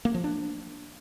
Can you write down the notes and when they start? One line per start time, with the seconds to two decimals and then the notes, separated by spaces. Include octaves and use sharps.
0.05 A#3
0.14 F3
0.24 D4